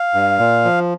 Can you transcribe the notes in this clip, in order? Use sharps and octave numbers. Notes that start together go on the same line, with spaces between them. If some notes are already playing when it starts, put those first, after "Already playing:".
Already playing: F5
G2
A#2
F3